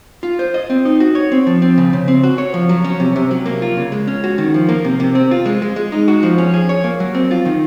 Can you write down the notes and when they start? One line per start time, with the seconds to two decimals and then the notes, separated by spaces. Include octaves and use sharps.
0.23 F4
0.39 C5
0.54 D#5
0.70 C4
0.85 D#4
1.00 F#4
1.15 C#5
1.32 C4
1.47 F3
1.62 C4
1.78 C#3
1.93 C#3
2.08 C4
2.24 F#4
2.38 C#5
2.54 F3
2.69 F#3
2.84 C#4
3.00 C3
3.16 C3
3.31 F#3
3.46 A#3
3.62 F4
3.77 C#3
3.92 G#3
4.07 C#4
4.24 F#4
4.38 D#3
4.54 F3
4.69 A#3
4.84 C3
5.00 C3
5.15 C4
5.31 F4
5.46 G#3
5.62 G#3
5.76 G#3
5.92 D#4
6.08 F#4
6.23 F3
6.38 C#4
6.54 G#4
6.69 C#5
6.84 A#3
7.00 F#3
7.15 C4
7.31 F4
7.46 D#3